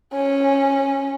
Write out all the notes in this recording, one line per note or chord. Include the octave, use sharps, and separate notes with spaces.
C#4